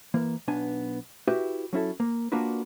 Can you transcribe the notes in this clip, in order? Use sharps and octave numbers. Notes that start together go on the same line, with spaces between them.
E3 A#3
B1 B3 D4 G#5
E4 F#4 G4 B4 E5
F#3 C#4 E4 A4
A#3
A#3 D4 F4 F#4 A#4 B4